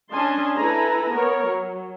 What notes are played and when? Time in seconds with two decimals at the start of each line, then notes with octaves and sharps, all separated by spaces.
0.11 C#4 D4 D#5 G#5 A5 C6
0.57 E4 A4 B4 G#5 A#5
1.11 B3 A#4 C#5
1.45 F#3